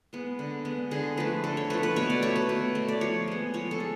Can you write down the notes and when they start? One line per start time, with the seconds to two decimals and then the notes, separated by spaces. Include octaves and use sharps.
0.13 G#3 B3
0.39 D3
0.65 G#3 B3
0.91 D3 G#4
1.17 F3 A3 B4
1.44 D3 A4
1.57 C#5
1.70 F3 A3 B4
1.83 B4
1.96 B2 C#5
2.10 D5
2.22 A3 C#5
2.36 B4
2.49 B2
2.75 A3
2.88 D5
3.01 F3 C#5
3.28 G#3 B3
3.54 F3 C#5
3.71 A4
3.80 G#3